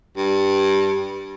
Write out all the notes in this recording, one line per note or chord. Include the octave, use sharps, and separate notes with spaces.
G2